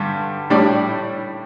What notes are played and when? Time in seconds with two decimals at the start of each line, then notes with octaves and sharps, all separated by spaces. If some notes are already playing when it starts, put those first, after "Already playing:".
Already playing: G2 D3 G3
0.50 A2 G3 D4 D5